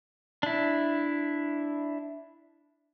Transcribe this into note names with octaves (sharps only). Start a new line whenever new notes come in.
D4 E4